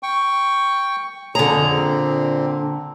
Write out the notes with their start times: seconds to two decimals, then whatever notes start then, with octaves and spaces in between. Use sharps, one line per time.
0.03 G5 C#6
1.35 F2 D3 G#4 A#5
1.68 A#2 C4